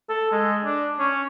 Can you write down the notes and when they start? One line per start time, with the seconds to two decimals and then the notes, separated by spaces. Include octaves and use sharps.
0.09 A4
0.32 G#3
0.65 D4
0.99 C#4